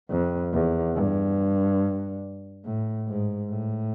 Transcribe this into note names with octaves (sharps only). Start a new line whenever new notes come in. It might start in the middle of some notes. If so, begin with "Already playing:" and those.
F2
E2
G2
A2
G#2
A2